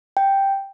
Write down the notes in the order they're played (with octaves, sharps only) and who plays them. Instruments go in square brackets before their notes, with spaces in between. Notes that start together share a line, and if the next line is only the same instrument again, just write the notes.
[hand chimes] G5